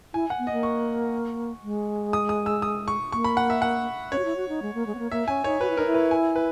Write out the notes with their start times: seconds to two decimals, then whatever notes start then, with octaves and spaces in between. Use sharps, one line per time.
0.14 E4 G#5
0.30 F#5
0.38 B3
0.47 A#3 D#5
0.63 C#6
1.63 G#3
2.13 D#6
2.29 D#6
2.46 E6
2.62 D#6
2.88 C#6
3.12 A#3 C#6
3.24 B5
3.37 F#5
3.50 E5
3.62 F#5
4.12 C#4 C#5
4.18 F#4
4.25 E4
4.36 F#4
4.49 D#4
4.62 G#3
4.74 A#3
4.86 G#3
4.95 B3
4.99 A#3
5.11 A#3 E5
5.28 C#4 G#5
5.44 D#4 C#5
5.61 F#4 B4
5.69 E4
5.77 D#4 A#4
5.86 E4
5.94 B4
6.11 G#5
6.36 B4